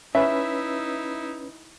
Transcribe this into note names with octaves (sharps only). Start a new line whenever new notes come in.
C#4 D#4 E4 B4 E5